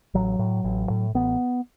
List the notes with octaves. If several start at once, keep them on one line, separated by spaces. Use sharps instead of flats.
A1 F#3
A2
A1
A2
A1 B3